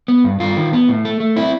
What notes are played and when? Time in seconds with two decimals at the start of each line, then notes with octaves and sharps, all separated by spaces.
0.08 B3
0.24 G2
0.40 G2 F4
0.57 D#3
0.73 B3
0.88 A2
1.05 A3
1.20 A3
1.36 C4 E4